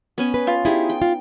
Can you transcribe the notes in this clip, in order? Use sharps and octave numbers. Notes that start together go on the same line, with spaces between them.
B3 C#4 G#5
B4
F4
D#4 E4 G4 G#4 G#5
G5
F4